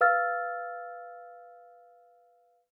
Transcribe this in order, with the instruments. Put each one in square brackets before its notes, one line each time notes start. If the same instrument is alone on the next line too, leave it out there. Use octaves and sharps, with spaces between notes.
[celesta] B4 F5 E6 F6 A6